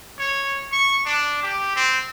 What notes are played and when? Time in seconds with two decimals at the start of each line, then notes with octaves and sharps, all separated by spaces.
0.18 C#5
0.72 C#6
1.06 D4
1.43 G4
1.76 C4